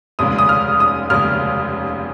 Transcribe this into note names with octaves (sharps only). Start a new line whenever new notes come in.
F1 D#2 C#3 G#3 D#6
D#6
F6
D#6
F1 D#2 C#3 G#3 F6